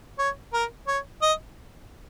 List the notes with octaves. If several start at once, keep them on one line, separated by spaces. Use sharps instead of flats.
C#5
A#4
C#5
D#5